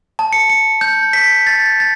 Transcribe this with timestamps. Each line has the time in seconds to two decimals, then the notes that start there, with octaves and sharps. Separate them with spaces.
0.19 A5
0.33 C#7
0.50 C#7
0.81 G6
1.13 B6
1.47 A6
1.80 A6